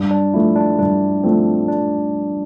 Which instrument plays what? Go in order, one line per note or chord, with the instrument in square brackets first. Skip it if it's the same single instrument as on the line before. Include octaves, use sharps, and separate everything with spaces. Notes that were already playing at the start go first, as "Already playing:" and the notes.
Already playing: [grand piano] G2 [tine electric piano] D4
[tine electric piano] D4
[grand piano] F3 A3 [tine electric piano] E4
[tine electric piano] D4
[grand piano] G2 [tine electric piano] D4
[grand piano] F3 A3 [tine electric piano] C4
[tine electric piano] D4